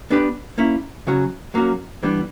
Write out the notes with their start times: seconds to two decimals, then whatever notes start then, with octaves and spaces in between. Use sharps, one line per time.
0.10 B3 D4 G4 B4 D5
0.58 A#3 C#4 E4
1.07 C#3 F#3 C#4 F#4
1.54 F#3 A#3 C#4 F#4
2.03 E3 G3 B3 D4